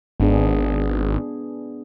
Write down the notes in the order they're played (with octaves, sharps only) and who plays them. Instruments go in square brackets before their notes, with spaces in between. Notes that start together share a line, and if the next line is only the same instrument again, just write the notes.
[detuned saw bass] G#1 [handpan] B3 D4 G#4